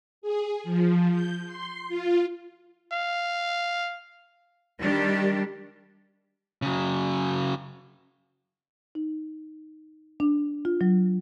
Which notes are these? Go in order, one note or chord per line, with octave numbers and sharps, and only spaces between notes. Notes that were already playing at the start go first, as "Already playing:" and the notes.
G#4
F3
G6
C6
F4
F5
D#3 G3 D4 G4
C#3 F#3
D#4
D4
F4
F#3